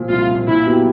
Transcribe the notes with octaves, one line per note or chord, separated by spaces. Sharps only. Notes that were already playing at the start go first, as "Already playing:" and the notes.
Already playing: A#2 F3
C2 F4
A#2 F3
A#2 E4
F#3 B3 E4 G4